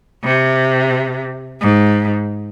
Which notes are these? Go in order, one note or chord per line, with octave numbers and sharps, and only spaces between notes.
C3
G#2